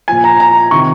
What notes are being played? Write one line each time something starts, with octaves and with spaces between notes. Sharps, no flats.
A#2 F3 G#5
A#5
A#5
C3 D#3 C#6